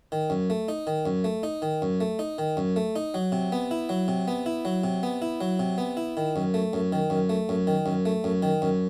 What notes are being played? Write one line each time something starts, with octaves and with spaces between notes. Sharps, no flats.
D#3
F#2
A3
D#4
D#3
F#2
A3
D#4
D#3
F#2
A3
D#4
D#3
F#2
A3
D#4
F#3
C3
B3
E4
F#3
C3
B3
E4
F#3
C3
B3
E4
F#3
C3
B3
E4
D#3
F#2
A3
F#2
D#3
F#2
A3
F#2
D#3
F#2
A3
F#2
D#3
F#2